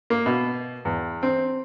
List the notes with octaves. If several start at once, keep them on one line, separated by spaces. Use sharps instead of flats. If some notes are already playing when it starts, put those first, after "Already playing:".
A#3
B2
E2
C4